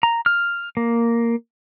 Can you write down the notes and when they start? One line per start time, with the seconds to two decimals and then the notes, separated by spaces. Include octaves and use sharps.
0.03 A#5
0.26 F6
0.77 A#3